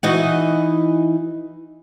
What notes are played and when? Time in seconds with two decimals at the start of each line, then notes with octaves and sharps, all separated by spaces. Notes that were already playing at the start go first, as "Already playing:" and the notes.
0.03 E3 D#4 F#4